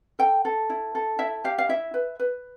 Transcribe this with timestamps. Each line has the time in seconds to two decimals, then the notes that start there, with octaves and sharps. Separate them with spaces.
0.19 A4 G5
0.45 A4
0.70 E4
0.95 A4
1.19 E4 E5
1.44 G4 F5
1.58 F5
1.69 E4 E5
1.94 B4
2.19 B4